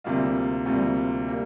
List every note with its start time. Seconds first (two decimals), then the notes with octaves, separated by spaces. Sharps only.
0.04 D2 C3 G3 A#3 F4
0.66 D2 C3 G3 A#3 F4
1.28 G3 A#3